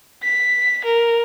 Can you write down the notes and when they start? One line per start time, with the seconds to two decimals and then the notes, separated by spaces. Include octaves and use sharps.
0.23 B6
0.85 A#4